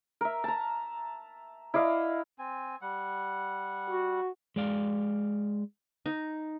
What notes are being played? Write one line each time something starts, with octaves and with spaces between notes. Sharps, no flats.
A#4 E5
A5 A#5
E4 D5 D#5 F5
C4 G#5
G3 F#5
F#4
G#3 D5 F5
D#4